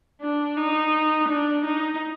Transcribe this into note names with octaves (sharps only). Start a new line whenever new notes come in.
D4
D#4
D4
D#4